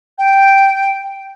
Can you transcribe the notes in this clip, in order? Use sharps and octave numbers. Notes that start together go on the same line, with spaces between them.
G5